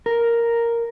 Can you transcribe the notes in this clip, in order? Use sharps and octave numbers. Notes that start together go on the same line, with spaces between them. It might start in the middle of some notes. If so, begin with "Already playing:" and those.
A#4